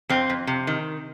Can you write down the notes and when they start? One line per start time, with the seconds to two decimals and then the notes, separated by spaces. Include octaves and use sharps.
0.09 F2 C4
0.30 F2
0.47 C3
0.67 D#3